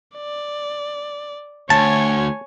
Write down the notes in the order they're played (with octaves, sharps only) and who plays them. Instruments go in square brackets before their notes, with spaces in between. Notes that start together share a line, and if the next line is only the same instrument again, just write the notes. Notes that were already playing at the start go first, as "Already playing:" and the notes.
[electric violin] D5
[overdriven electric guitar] D2 [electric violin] C#5 G#5 [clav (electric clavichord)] A5